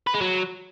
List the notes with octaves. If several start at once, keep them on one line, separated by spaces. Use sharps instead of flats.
B4
G#3
F#3